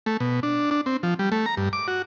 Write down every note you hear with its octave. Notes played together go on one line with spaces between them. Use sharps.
A3
B2
D4
D4
C4
F3
G3
A3
A#5
G2
D6
F#4